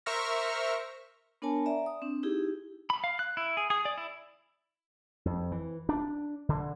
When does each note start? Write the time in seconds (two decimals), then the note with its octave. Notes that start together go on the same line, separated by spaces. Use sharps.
0.06 A#4 C5 E5 C#6 F6 A#6
1.42 B3 D4 A#4 C#5 G#5 A5
1.66 D5 E5 A#5
1.86 D#6
2.02 C4 D4
2.23 D#4 E4 G4 G#4
2.90 B5
3.04 F5
3.19 F#6
3.37 E4
3.57 G#4
3.70 G#4
3.85 D5
3.98 E4
5.25 F2
5.52 E3
5.89 D4
6.49 D3